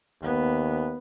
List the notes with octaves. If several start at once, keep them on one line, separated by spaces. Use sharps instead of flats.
D#2 B3